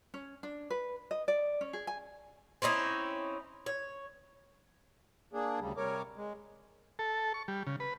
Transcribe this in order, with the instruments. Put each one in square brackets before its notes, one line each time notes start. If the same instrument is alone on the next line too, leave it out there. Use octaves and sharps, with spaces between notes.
[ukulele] C#4
D4
B4
D#5
D5
C#4
G#4
G#5
[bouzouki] C4 C#4 D#4 E4
C#5
[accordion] A#3 D4 G#4
D2 C#3 G3
C3 G3 A#4 C#5 D6
G#3
[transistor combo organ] A4
C#6
G3
C#3
B4